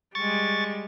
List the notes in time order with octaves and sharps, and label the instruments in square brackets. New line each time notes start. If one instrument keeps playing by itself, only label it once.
[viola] G3 G#3 [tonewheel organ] C#6 A6